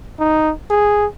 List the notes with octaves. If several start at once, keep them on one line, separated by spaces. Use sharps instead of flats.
D#4
G#4